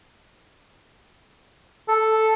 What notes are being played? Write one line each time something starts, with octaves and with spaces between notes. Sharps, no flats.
A4